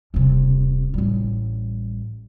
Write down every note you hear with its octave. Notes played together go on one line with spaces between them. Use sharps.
D#1 C3
A1 G3